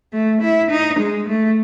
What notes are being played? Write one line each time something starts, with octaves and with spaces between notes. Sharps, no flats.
A3
E4
D#4
G#3
A3